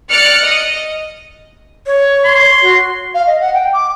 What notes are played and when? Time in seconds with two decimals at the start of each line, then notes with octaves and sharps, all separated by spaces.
0.11 D5 F6 F#6 C#7
0.43 D#5
1.86 C#5
2.24 C6
2.62 F#4
3.14 F5
3.27 D#5
3.40 F#5
3.54 G5
3.73 D6